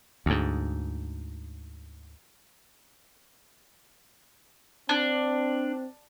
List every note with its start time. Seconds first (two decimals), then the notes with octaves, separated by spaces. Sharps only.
0.26 D2 G#2
4.89 C4 D4